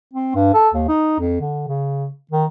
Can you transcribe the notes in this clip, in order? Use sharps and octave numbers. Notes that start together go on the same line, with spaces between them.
C4
G2
A4
D#2
D#4
F2
D3
C#3
D#3